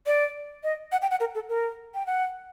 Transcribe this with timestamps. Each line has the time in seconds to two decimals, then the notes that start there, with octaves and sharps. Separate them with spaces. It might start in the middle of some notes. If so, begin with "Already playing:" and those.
0.07 D5
0.64 D#5
0.92 F#5
1.02 G5
1.11 F#5
1.20 A#4
1.35 A4
1.49 A#4
1.95 G5
2.07 F#5